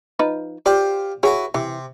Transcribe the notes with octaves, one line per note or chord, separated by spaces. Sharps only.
F3 D#4 B4
F4 G4 C5 D5
E4 F#4 G#4 B4 C#5
C3 E3